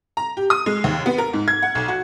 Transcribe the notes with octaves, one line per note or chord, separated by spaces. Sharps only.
A#5
G4
D#6
G#3
D#2
B3
A#4
G#2
G#6
F#5
B1
F#4